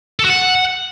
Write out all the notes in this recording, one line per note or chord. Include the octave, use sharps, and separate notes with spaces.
A4
F#4
F#5